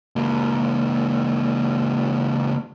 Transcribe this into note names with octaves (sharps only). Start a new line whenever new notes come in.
C#2 A#3